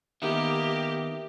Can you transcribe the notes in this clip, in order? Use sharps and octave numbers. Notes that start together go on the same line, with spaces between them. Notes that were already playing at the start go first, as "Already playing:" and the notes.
D#3 A#3 B3 G4 E5